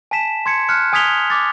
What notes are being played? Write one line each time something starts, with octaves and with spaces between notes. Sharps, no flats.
G#5 A5 B6 E7
C6 G#6 C#7
F6 F#6 C#7
G#5 D#6 G#6 B6 F7 G7
D6 A6